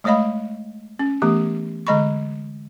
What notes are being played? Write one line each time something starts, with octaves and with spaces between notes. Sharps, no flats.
G#3 A3 C#5 D#5 F5 B5
C#4
E3 A3 B3 G4
D3 G#3 D#5 B5 C#6